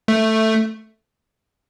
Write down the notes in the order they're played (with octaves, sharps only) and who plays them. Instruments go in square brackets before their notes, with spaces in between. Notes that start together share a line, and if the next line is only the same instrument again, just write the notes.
[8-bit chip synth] A3